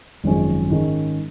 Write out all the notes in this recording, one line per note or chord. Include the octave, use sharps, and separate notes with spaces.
G#1 F#2 F3 G#3 C#4
G#2 D#3 G#3 C#4